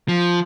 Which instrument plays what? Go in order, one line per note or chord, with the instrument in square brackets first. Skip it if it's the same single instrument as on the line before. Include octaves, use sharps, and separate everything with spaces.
[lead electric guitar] F3